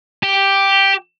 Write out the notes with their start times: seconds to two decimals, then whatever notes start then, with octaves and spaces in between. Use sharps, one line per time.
0.23 G4